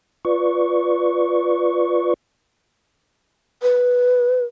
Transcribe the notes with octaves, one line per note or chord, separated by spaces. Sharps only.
F4 B4 D5 C#6
B4